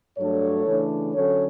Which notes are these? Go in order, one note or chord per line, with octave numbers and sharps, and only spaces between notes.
G2 F#3 A3 D4 A4 C#5
C#3 E3 A3 D4
D3 F#3 C#4 A4 C#5